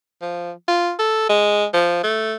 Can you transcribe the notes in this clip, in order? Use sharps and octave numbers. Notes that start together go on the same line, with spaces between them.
F3
F4
A4
G#3
F3
A3